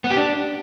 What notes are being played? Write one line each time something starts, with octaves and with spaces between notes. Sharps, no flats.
B3
G4
D4